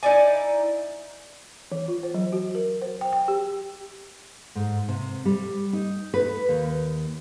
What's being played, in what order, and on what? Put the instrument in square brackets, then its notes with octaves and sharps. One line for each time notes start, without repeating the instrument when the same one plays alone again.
[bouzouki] D#4 E4 D5 G#5
[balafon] E3
F4
C5
F#3
F#4
A#4
C5
G5
G5
G4
[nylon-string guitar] G#2
C3
G3
D#4
B4
D#2